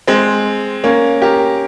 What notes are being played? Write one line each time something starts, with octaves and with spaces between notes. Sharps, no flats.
G#3 C4
A#3 C#4
G4 A#4